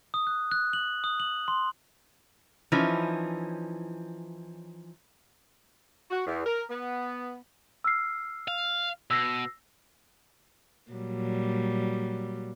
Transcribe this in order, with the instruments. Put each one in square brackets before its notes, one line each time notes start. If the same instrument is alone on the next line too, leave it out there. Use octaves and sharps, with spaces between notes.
[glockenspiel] D#6
F#6
F#6
F#7
D#6
F#7
C6
[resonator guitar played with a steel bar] E3 F3 C#4 D#4
[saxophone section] F#4
E2
A#4
B3
[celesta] E6 F6 C7
[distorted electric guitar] F5
[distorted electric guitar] B2 [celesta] E6 A#6 C7
[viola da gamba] A#2 F#3 G3